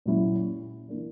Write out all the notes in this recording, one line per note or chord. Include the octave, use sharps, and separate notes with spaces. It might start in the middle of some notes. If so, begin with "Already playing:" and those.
A#2 F#3 C#4 E4
E3 A#3 D4